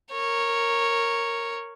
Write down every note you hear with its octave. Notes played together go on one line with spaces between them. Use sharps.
A#4 C#5